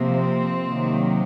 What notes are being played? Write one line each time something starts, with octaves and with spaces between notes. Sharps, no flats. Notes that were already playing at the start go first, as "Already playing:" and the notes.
Already playing: C3 F3 A#3
C4
C3 D#3 F#3 A#3